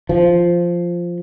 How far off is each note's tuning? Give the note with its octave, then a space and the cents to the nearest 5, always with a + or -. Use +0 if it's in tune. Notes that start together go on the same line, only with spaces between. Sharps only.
F3 -5